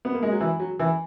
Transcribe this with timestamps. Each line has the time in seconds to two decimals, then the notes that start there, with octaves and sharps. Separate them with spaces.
0.05 B3
0.14 A#3
0.23 G#3
0.32 F#3
0.40 E3
0.60 F#3
0.79 E3